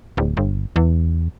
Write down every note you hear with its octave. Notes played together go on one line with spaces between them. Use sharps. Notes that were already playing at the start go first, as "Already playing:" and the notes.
D1
G1
E2